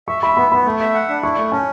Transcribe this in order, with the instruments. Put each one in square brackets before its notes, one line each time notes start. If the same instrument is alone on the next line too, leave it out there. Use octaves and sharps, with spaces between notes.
[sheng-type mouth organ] E5 [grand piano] C#6
[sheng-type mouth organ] E5 [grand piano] B5
[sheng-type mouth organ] B3 [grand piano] B5
[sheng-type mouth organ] B3 [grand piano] B5
[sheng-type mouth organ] A3
E5
F#5
D4
[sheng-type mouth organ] E4 [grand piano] C#6
[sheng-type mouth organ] A3
[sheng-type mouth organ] C#4 [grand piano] A5